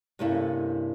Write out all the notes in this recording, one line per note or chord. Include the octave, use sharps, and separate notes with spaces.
G2 C3 A#3 C#4 E4 A4